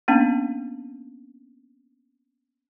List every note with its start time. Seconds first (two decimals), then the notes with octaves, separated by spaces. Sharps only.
0.08 A#3 B3 C#4 D4